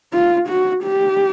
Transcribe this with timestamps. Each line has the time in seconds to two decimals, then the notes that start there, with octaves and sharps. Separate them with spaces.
0.13 F4
0.48 F#4
0.84 G4